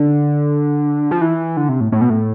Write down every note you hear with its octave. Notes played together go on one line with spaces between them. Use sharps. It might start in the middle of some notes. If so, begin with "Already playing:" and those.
Already playing: D3
F3
E3
D3
C3
A2
A2
B2
A2